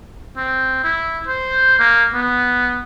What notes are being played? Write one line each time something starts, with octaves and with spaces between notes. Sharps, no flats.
C4
E4
C5
A#3
B3